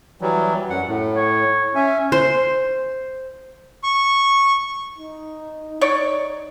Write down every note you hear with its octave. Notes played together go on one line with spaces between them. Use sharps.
E3 F#3 G3
F#2 F#5
A2
C#5
C#4 E5 G#5
C5
C#6
D#4
D#4 C#5 D5